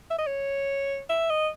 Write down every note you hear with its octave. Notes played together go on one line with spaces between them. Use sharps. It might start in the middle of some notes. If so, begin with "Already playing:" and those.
E5
D#5
C#5
E5
D#5